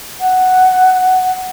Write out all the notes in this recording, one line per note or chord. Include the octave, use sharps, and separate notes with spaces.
F#5